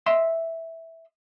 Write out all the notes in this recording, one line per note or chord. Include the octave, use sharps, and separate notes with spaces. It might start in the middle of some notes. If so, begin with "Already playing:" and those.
D#5 E5 C6